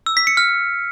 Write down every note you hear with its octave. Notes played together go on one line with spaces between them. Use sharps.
E6
B6
C#7
F6